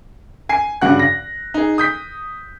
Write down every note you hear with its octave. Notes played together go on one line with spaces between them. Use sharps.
G#5 C7
G2 C#3 F#4 F#5 F#6
A#6
D#4 G#4
D#6 G6 B6